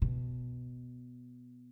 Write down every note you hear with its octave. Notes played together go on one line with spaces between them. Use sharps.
B2